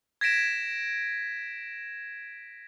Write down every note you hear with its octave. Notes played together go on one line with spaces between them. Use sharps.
G#6 A#6 B6 D7 E7